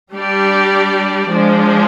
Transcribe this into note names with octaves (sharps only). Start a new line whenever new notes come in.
G3 D4 G4 D5
F3 G#3 D4